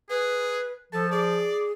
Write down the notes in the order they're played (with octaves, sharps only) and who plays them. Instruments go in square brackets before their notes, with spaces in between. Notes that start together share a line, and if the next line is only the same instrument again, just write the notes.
[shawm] G#4 [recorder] B4
[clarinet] F3 [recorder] A4 [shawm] A5
[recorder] G#4 [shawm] D5